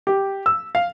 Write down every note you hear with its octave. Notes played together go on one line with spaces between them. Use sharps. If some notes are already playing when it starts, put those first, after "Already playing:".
G4
E6
F5